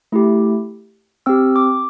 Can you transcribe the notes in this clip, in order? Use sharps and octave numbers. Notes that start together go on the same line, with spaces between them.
A3 E4 G4
C4 G4 E6
D6